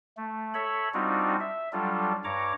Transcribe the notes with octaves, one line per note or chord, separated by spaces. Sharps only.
A3
A4 C#5 E5 B5
G3 C4 D4 D#4 F4 F#4
E5
F#3 G3 D4 F4 A4
G2 C#5 A#5 D6